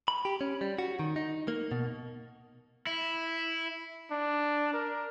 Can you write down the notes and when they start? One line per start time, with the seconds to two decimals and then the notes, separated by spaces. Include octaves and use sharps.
0.08 B5
0.25 G4
0.41 C#4
0.61 G3
0.79 F#4
0.99 D#3
1.16 D#4
1.48 A#3
1.71 B2
2.87 E4
4.11 D4
4.74 A#4